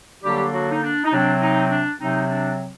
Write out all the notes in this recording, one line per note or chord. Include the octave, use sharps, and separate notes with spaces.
D3 F#3 G3 A#3 D4 G4
F#3 F#4
D#4
D4
D#4
C3 F#3 C4 D4
D#4
D4
C3 F#3 C4 D#4
D4